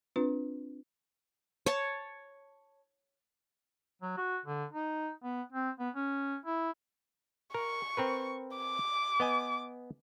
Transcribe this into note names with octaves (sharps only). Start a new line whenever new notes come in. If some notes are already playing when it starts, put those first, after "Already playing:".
C4 D4 F4 B4
C#5 A5
F#3
F#4
D3
D#4
B3
C4
B3
C#4
E4
A#4 C#6
C4 A#4 B4
D6
B3 D#5 G#5